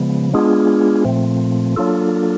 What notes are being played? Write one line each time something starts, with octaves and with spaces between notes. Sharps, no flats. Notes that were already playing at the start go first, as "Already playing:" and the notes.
Already playing: C#3 F3 G#3 B3
G#3 B3 D4 F4 G#4
A#2 F3 A3 C4
F#3 A#3 D4 F4 A4